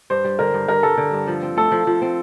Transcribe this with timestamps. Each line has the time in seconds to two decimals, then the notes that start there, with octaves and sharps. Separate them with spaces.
0.10 G2 C5
0.24 G3
0.39 D3 A#4
0.54 G2
0.68 G2 A#4
0.83 G3 A4
0.98 D3
1.13 G2
1.27 F3
1.43 C4
1.57 A3 A4
1.72 F3
1.87 F3
2.02 C4